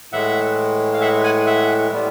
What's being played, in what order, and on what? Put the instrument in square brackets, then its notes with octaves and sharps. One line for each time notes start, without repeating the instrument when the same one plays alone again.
[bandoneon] A2 E3 G#3 E5 F#5
F5
E5 F#5
F#5 G#5
E5 F#5
A2 E3 G3 B3